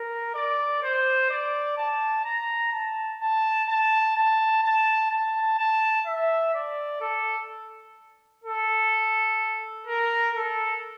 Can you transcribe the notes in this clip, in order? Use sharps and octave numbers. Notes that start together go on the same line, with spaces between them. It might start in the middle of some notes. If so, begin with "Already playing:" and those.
Already playing: A#4
D5
C5
D5
A5
A#5
A5
A5
A5
A5
A5
A5
A5
E5
D5
A4
A4
A#4
A4